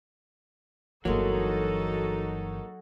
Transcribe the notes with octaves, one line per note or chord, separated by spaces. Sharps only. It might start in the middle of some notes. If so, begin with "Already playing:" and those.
G1 E3 F#3 G#3 A#3 D#4 F#4 A4